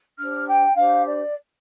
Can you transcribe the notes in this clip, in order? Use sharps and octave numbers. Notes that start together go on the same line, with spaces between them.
D4 G4 C5 F6
G5
D4 G4 C5 F5
D5